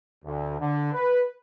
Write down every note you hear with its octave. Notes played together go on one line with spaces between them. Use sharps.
D2
D3
B4